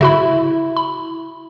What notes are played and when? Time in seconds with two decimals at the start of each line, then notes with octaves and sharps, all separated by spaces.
0.01 C#3 E4 F#4 B5
0.77 B5